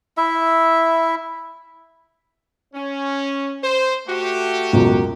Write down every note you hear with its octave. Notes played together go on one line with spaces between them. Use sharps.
E4 E5
C#4
C5
A3 F#4 G4
C#2 F#2 B2